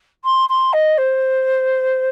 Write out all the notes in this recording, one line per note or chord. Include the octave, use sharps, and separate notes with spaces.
C6
C6
D#5
C5